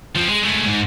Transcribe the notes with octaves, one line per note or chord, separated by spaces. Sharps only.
F3 C4
G#3
G#3 A3
G#2